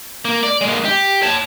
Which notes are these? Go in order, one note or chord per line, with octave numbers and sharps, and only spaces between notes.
A#3
D5
G#3 A#3
G4
C#5 A5